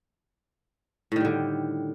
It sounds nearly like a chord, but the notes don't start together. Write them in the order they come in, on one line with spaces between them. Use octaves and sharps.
A2 D#3 G3 D3